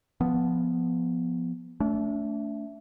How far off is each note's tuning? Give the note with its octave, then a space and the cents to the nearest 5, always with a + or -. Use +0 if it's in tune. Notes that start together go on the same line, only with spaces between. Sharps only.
F3 +0 B3 +0
A3 +0 D4 -40